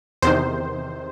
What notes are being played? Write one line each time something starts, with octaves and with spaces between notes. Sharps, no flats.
E2 C3 D#3 C5